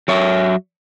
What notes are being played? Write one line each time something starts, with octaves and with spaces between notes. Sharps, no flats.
F#3 C#5 E5